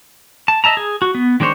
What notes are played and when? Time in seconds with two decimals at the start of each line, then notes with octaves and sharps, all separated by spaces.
0.48 A5
0.64 D#5 E5 A5 A#5
0.77 G#4
1.02 F#4
1.15 B3
1.40 D#3 G#3 D4 C5 C#5